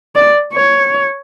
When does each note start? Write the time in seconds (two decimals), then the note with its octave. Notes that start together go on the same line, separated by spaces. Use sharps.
0.16 D5
0.54 C#5